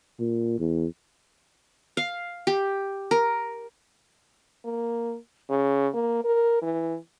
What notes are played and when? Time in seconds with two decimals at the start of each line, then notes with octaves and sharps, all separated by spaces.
0.19 A#2
0.59 E2
1.97 F5
2.47 G4
3.11 A#4
4.65 A#3
5.50 C#3
5.94 A#3
6.24 A#4
6.62 E3